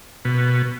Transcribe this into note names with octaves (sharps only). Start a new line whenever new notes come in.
B2